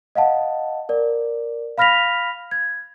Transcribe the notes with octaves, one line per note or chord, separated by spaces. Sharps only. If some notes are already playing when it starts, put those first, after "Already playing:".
D#5 F5 F#5 A5
A#4 D5
F5 B5 F6 A#6 B6 F7
G#6